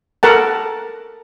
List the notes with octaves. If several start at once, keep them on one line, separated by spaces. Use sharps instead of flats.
A4 A#4 F#5 A5